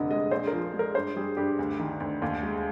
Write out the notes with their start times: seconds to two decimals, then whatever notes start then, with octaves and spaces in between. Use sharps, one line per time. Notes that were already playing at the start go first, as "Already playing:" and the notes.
Already playing: F1 D3 D#5
0.11 G#3 D#5
0.31 A#1 C5
0.47 A#4
0.53 F3
0.74 G#3
0.79 A#4
0.95 G2 C5
1.16 G3 G#4
1.37 G2 G4
1.59 D2
1.79 D#3
2.00 D2
2.22 D#2
2.43 G#3